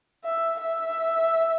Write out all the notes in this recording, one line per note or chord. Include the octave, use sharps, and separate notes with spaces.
E5
E5